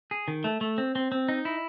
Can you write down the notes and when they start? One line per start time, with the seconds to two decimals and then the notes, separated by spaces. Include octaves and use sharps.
0.11 G#4
0.28 D#3
0.44 A3
0.61 A3
0.78 C4
0.95 C4
1.12 C4
1.28 D#4
1.45 E4